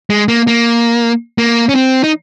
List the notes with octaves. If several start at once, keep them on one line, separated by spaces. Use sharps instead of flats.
G#3
A#3
A#3
A#3
C#4
C4
D#4